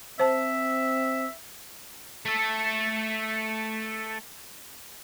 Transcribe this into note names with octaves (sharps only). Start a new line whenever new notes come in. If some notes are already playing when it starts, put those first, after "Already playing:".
C4 C5 E5 A5
A3 A4